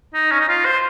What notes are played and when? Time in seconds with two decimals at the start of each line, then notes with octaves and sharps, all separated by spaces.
0.14 D#4
0.32 C#4
0.40 D#4
0.49 F4
0.65 C5